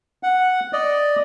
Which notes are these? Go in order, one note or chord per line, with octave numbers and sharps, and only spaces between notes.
F#5
D5 D#5